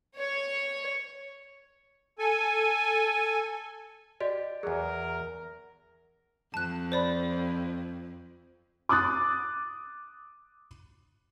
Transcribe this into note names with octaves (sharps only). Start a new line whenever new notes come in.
C#5
A4 G#5
F#4 G4 D5 D#5
E2 F#3 G#4 A#4
F2 A5 F#6
C5 D5 B5
D6 D#6 F#6 A6